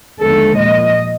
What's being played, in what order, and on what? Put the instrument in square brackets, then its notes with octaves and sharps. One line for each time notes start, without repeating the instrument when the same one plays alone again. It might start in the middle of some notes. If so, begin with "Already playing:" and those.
[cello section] D#2 D3 F3 G#3 B3 A4
A#2 F3 A#3 D#5